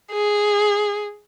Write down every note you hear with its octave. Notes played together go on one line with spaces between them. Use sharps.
G#4